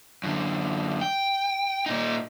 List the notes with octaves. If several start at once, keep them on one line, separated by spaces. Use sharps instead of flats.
F#2 D3
G5
A#2 D#4